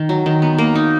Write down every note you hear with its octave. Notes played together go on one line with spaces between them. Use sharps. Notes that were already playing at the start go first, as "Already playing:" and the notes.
Already playing: D#3
F#3
D#3
B3
A#3
D#4